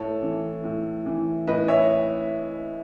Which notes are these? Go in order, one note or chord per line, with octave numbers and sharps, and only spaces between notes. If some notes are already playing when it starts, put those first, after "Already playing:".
Already playing: A2 A4 C#5
E3
A2
E3
A2 B4 D#5
C#5 E5